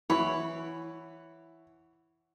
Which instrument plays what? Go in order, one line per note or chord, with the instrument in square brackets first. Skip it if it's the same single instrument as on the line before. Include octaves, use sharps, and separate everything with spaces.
[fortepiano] E3 [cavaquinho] C#5 F#5 B5